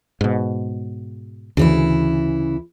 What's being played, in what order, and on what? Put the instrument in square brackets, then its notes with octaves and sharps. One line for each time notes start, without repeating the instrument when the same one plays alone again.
[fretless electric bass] G#2 B2
[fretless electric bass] D2 [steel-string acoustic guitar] C#3 E3 E4